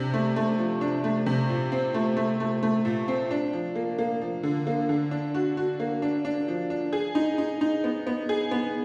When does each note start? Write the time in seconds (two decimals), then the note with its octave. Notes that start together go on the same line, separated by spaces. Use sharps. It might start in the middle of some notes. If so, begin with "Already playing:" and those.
Already playing: C3 D4
0.14 A3
0.36 A3
0.58 F3
0.81 D4
1.04 A3
1.26 C3
1.49 A#2
1.72 C4
1.94 A3
2.17 A3
2.40 A3
2.63 A3
2.85 A#2
3.08 C4
3.31 D4
3.53 F3
3.76 A#3
3.98 A#3
4.21 F3
4.43 D3
4.67 A#3
4.89 D3
5.11 D4
5.34 F#4
5.57 F#4
5.80 A#3
6.02 D4
6.25 D4
6.48 F3
6.70 D4
6.93 G#4
7.15 D#4
7.38 D#4
7.61 D#4
7.84 B3
8.07 B3
8.29 G#4
8.51 B3